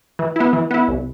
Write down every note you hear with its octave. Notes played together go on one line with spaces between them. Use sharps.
E3
B3 E4
E3
B3 E4
C2